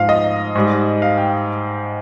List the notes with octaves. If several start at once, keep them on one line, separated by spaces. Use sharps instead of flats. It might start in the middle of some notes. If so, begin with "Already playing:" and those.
Already playing: G#2 F3 F5
D#5
G#2 G3
F5
G5